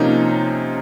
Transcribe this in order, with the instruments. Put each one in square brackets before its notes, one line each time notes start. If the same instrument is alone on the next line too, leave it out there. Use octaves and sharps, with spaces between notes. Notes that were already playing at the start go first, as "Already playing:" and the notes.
Already playing: [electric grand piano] C3 F3 A#3 C#4 D#4